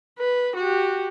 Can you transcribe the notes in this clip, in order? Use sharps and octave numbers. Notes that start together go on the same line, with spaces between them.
B4
F#4 G4